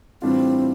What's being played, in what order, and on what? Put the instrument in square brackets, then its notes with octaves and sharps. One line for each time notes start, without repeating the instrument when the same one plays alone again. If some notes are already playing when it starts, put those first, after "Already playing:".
[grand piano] A2 E3 G3 D4 F4 [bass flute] C4